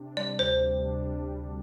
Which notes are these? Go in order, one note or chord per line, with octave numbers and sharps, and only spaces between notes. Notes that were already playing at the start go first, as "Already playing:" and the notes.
Already playing: C3 D4
G3 D5
D2 C5
C3
D4
G3
D2